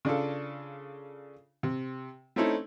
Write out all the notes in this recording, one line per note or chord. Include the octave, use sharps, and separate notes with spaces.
C#3 D4 F4 A4
C3
A3 C4 C#4 D#4 E4 A4